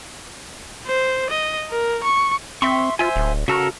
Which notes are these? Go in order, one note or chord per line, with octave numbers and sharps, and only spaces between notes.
C5
D#5
A#4
C#6
C4 E5 C6 C#6
F4 C5 E5 G#5
D1
C#3 F#4 A4 A#4